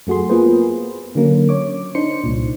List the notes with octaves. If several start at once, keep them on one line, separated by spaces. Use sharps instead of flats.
F#2 A3 F#4 G#4 C6
A#3 B3 F4 G#4 B4 C5
D3 F#3 A#3 C#4
C#5 D6
D4 D#4 C5 C6 C#7
C2 A#2